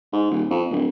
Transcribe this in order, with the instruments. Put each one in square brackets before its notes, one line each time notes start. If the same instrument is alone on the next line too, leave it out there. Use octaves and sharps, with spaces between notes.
[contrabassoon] G#2
D#1
F2
D1